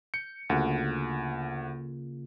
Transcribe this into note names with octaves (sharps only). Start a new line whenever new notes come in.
G6 C#7
D2 C#3 A#3 F4 F#5